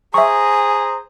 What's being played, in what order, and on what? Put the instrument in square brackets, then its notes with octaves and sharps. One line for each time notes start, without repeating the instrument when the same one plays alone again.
[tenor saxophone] G#4 [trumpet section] C5 A#5 [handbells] E5 C#6 [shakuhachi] G#5